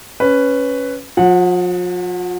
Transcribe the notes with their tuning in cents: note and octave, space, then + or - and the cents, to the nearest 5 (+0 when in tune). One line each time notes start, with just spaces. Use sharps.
C#4 +0 B4 +5
F3 +40 F#5 -15